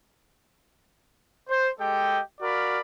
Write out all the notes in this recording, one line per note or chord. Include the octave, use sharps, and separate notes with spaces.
C5
G#3 G4 A4 D#5 G5
F#4 A#4 D5 F5 B5